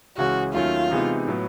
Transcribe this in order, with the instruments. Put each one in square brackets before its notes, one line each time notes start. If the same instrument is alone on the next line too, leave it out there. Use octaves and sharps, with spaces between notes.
[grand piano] C#2 C#3 E3 G#3 C#4 [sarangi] F#4
[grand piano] D#2 D#3 F#3 A3 C#4 [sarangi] F4
[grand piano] C3 E3 G#3 B3 D#4
A2 F#3 B3